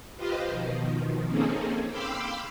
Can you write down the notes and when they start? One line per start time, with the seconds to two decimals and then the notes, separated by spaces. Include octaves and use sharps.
0.16 F4 G4 B4 C5 D#5 F5
0.49 B2 D#3 F3
1.26 A#3 C4 C#4 D#4 G#4 A4
1.90 F5 G5 B5 C6 D6 E6